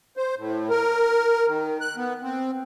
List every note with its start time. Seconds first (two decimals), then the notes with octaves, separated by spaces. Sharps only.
0.17 C5
0.38 A2
0.70 A#4
1.47 D#3
1.81 F#6
1.97 B3
2.23 C4